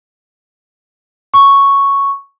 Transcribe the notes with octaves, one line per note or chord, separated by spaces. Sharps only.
C#6